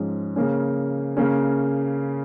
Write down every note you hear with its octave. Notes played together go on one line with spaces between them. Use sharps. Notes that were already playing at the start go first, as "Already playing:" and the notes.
Already playing: G#2 F3 G#3 C#4
C#3 A#3 C#4
C#3 A#3 C#4